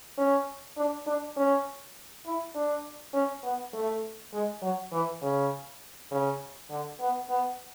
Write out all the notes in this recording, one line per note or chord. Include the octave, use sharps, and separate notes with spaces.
C#4
D4
D4
C#4
E4
D4
C#4
B3
A3
G#3
F#3
E3
C#3
C#3
D3
B3
B3